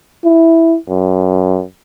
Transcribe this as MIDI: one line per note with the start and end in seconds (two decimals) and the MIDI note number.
0.24 0.77 64
0.89 1.63 42